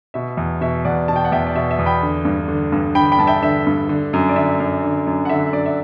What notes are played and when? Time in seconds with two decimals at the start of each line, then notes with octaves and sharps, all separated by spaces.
0.14 B2 E5
0.37 E2
0.61 B2 E5
0.85 E2 D5 F#5
1.08 B2 A5
1.16 G5
1.25 F#5
1.32 E2 E5 G5
1.47 D5
1.55 B2 E5
1.71 E5
1.79 E2
1.86 G5 B5
2.03 D3
2.25 G2
2.48 D3
2.72 G2
2.95 D3 G5 B5
3.12 G5 B5
3.18 G2 A5
3.27 E5 G5
3.42 D3 E5
3.66 G2
3.89 D3
4.13 F#2
4.29 D5
4.36 D3 E5
4.60 F#2
4.83 D3
5.07 F#2
5.25 F#5
5.29 D3 E5
5.53 F#2 D5
5.66 E5